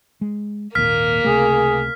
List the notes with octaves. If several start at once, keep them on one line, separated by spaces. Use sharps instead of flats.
G#3
G#1 D#2 A#2 A#3 F6 B6
C#2 C3 A3 G#4